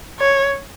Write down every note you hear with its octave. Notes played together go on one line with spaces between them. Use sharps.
C#5